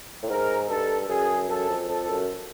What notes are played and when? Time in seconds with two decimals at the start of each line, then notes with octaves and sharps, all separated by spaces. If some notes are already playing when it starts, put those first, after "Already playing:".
0.23 A2
0.29 G#2 A#4
0.69 G2 A4
1.09 F#2 G#4
1.49 F#2 A4
1.69 F2
1.89 F2 A4
2.09 F#2